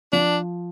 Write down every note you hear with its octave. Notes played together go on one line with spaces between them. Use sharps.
F3 D4